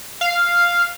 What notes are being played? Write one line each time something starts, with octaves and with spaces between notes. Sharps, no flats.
F5